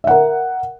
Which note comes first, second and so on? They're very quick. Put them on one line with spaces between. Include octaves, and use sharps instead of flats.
E5 F#5 A#4